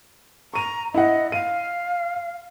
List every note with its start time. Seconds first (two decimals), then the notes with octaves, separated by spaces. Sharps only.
0.54 A#5 C#6 D#7
0.94 E4 D#5 F#5
1.32 F5 D#7